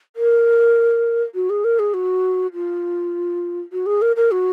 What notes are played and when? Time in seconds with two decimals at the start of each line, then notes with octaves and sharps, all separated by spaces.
0.16 A#4
1.35 F#4
1.50 G#4
1.64 A#4
1.79 G#4
1.94 F#4
2.54 F4
3.72 F#4
3.86 G#4
4.02 A#4
4.16 A#4
4.31 F#4